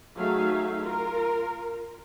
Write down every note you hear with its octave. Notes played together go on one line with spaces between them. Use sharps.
F#3 A3 D#4 G#4 E5 F5
F4 A#4